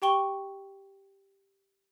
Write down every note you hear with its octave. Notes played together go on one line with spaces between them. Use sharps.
G4 G5 C#6 G7